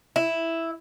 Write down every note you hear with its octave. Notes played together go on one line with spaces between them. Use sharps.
E4